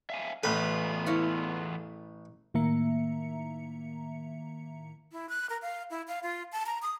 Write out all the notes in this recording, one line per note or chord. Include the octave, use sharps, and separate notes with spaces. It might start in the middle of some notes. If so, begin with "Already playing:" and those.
E5 F5 G#5
A1 E2 B3 F4 A4 B4
E4 C#5 F5
A2 D#3 A#3 E5 A#5 C#7
E4
F#6
A#4
F5
E4
F5
F4
A5
A#5
D#6